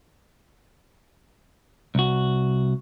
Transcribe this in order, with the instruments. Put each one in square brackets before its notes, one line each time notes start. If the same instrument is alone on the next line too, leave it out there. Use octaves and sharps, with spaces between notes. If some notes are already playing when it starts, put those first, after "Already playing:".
[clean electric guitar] C2 F#4